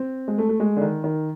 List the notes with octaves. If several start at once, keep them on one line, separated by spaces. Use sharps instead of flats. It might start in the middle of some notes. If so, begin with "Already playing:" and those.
Already playing: C4
G#3
A3
A3
G#3
D3
D#3
D#3